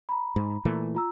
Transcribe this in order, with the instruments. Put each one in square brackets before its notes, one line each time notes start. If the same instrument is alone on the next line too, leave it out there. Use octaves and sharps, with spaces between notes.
[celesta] A#5 B5
[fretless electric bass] G#2
A#2 E3 A3
[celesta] F4 A#5 E6